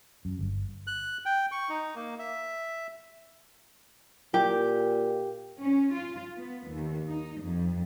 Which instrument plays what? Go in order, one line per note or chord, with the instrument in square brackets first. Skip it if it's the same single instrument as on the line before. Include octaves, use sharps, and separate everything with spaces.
[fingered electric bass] F#2
G1
[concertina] F#6
G5
C#6
D#4
A#3
E5
[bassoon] A#2 [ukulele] G4
[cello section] C#4
F4
B3
D#2
D#4
F2